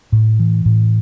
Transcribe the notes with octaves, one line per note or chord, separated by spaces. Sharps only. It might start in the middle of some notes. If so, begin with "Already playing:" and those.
A2
E3
A2